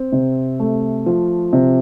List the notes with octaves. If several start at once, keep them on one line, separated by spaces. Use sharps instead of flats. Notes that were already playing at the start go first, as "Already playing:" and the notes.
Already playing: C4
C3
A3
F3
C3